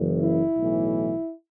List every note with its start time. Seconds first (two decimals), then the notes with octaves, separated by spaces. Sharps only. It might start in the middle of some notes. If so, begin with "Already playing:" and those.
Already playing: F#1 F#2 C#3 E3
0.21 E4
0.56 B1 A2 E3